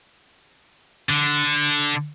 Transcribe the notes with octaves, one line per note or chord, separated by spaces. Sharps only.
D3